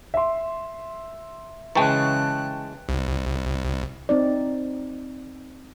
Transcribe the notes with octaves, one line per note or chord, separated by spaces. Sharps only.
E5 C6
C#3 E3 G#3 G5 A5 C#6 F#6
C2
C4 D#4 D5